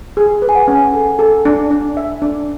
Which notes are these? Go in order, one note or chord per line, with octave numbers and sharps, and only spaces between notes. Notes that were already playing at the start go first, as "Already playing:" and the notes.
G#4
B4
G#5
F#5
C#4
A4
A4
D4
D4
E5
D4